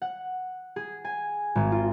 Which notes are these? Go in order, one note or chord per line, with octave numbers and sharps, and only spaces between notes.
F#5
G#4
G#5
G#1
F4